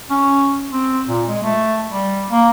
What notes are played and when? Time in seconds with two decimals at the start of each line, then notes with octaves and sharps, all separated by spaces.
0.10 C#4
0.73 C4
1.08 A#2
1.28 G#3
1.43 A3
1.90 G3
2.30 A#3